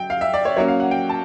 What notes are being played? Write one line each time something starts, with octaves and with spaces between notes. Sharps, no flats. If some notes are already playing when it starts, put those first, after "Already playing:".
Already playing: F#3 G5
F5
E5
D5
C#5
F#3 A#3 C#4 C#5
F5
F#5
G5
A5